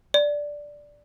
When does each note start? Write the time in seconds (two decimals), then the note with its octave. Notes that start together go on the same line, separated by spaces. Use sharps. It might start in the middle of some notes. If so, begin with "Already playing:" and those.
0.14 D5